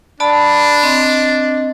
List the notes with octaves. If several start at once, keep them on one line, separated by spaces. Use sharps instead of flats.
D4 D5 A5 B5
C4 D#5